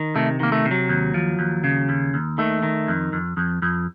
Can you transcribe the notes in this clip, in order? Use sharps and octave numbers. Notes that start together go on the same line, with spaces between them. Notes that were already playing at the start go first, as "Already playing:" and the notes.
Already playing: D#3
C3 A3
D#3 A#3
A3
C3
F#3
D#2
F3
D#2
C#3
D#2
D#2
D#3 A3
D#3
F2
F2
F2
F2